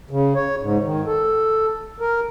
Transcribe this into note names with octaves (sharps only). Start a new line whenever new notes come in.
C#3
C#5
G#2
D#3
A4
A#4